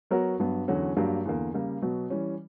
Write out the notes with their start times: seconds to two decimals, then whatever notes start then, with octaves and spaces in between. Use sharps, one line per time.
0.11 F#3 B3 F#4 A#4 C#5
0.40 G2 F#3 B3
0.68 E2 D3 F#3 C#4 F#4
0.97 G2 F#3 A#3 D4 G4
1.25 E2 D3 A#3
1.54 C#3 G3 A#3
1.82 B2 F#3 B3
2.10 E3 G3 C#4